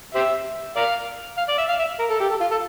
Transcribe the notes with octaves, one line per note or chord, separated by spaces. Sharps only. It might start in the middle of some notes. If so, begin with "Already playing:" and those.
G4 C5 E5
A#4 D5 F5
F5
D5
E5
F5
E5
A#4
A4
G4
A4
F4
A4